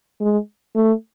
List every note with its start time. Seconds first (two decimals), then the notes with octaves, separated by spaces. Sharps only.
0.21 G#3
0.76 A3